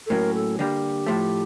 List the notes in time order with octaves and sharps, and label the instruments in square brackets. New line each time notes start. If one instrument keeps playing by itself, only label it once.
[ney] A4
[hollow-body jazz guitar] A2 F#3 A#3 C#4 [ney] A#4
[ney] A4
[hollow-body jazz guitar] D3 G3 A#3 [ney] G4
[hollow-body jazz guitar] A2 F3 A3